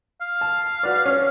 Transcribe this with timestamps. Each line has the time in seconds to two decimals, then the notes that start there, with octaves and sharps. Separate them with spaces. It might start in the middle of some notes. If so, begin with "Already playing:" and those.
0.21 F5
0.41 A5
0.83 F#4 B4 D5
1.06 C#4